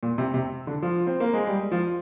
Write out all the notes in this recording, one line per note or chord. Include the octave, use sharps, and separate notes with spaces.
A#2
C3
C3
D3
F3
C4
A#3
G#3
G3
F3